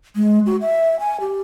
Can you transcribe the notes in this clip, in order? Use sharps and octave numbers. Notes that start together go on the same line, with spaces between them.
G#3
F#4
E5
G#5
G4